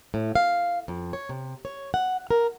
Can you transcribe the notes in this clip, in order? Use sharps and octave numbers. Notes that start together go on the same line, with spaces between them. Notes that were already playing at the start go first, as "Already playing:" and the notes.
A2
F5
F2
C#5
C3
C#5
F#5
A#4